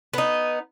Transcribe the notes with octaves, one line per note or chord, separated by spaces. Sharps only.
B3 D#4